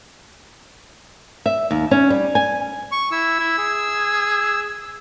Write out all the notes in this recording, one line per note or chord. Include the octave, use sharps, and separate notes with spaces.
E5
D#2
C#4
G3
G#5
C#6
E4 E6
E4
G#4